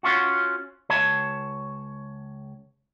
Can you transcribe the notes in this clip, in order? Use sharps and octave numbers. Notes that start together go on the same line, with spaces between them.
C#4 F4 F#4
C#2 C#5 A5